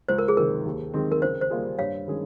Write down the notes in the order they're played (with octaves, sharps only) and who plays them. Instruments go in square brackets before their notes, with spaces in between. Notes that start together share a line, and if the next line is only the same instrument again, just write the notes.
[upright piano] C#2 [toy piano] C5
[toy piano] A#4
G#4
[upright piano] C3 D#3 [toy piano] A#4
[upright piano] D#2
D#3 G#3 C4
[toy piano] A#4
[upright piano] C#3 [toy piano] C5
[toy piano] C5
[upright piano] G3 A#3 F4 G#4
[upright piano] G2 [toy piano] C#5 F5
[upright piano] D#3 G#3 C#4 G#4